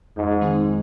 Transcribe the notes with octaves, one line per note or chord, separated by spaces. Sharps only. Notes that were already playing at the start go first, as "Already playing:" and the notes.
F2 G#2
D#3 G#3 C4 D#4